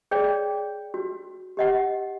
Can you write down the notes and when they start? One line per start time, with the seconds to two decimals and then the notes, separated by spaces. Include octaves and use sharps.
0.11 G#4 C#5 D5 G5
0.94 F#4
1.57 G4 D#5 F#5